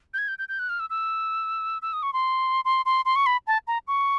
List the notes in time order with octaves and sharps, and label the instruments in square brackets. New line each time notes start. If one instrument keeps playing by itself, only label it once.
[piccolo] G6
G#6
G6
G6
G6
F#6
F6
E6
E6
E6
D#6
C#6
C6
C6
C6
C6
C#6
B5
A5
A#5
C#6